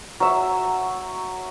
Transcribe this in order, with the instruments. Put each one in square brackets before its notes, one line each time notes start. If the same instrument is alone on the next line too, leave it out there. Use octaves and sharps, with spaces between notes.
[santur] F#3 E5